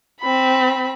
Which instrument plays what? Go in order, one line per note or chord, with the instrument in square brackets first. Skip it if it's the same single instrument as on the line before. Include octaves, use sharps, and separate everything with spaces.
[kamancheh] C4 B5